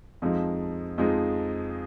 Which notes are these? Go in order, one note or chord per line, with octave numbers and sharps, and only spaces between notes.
F2 F3 G#3 D#4
F2 F3 G#3 D#4